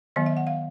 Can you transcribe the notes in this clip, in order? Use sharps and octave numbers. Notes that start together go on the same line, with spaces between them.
D#3 F#3 B3 D#5
E5
F#5
F5